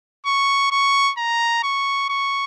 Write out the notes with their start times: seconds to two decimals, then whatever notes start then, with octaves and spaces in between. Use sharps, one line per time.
0.26 C#6
0.71 C#6
1.18 A#5
1.63 C#6
2.09 C#6